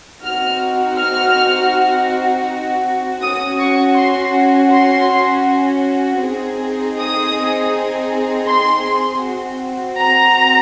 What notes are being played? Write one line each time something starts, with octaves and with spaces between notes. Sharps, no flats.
C4 D#4 F#4 F6
F6
C#4 F#4 D#6
C#6
C6
C6
C4 D#4 G#4
D#6
C6
C4 F#4
A#5